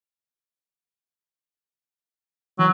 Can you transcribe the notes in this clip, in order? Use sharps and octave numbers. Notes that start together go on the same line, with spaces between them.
E3 F#3